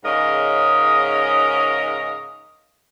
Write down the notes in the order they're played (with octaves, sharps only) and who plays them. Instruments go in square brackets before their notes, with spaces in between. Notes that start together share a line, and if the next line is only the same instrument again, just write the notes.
[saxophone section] G#2 C#3 C#4 A#4 D#5